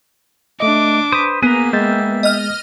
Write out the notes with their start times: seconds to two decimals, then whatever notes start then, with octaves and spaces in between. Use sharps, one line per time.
0.60 A3 D4 D#5 D6
1.12 B4 C5 D#6
1.43 A#3 B3 G#4 A#5
1.73 G#3 E5 G5 G6 A6
2.23 D#5 F6